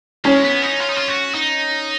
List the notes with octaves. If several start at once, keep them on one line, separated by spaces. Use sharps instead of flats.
G#3 C#4
B3
D#4
F4
D#4
F4
F#4
D#4